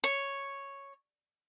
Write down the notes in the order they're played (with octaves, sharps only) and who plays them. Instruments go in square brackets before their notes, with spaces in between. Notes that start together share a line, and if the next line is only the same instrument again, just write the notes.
[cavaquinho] C#5